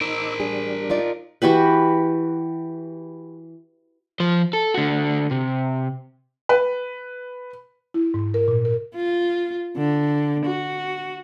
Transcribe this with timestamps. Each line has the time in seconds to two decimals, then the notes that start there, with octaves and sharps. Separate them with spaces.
0.01 D#4 A#4 C5 D6 E6
0.40 G3 D4 G#4
0.90 D#4 F4 D5
1.42 E3 F#4 G4 B4
4.20 F3 C5
4.53 A4
4.74 D3 F#4
5.31 C3
6.49 B4
7.94 E4
8.14 G#2
8.34 A#4
8.48 A#2
8.65 A#4
8.95 F4
9.77 D3
10.46 F#4